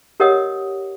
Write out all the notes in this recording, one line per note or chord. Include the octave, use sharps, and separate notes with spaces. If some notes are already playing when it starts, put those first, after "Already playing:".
G4 A#4 C#5 D#5 F#5 D#6